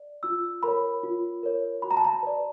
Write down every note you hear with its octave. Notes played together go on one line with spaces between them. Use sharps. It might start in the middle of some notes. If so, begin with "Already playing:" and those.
Already playing: D5
F4 E6
A#4 C#5 B5
F4
A#4 C#5
F#4 B5
A#5
A5
A#5
B4 D5